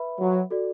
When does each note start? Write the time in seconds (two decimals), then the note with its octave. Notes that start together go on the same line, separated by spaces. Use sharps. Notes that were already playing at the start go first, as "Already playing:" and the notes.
Already playing: B4 E5 B5
0.19 F#3
0.50 F#4 A4 D5